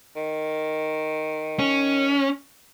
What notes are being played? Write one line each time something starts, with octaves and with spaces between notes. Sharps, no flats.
D#3
C#4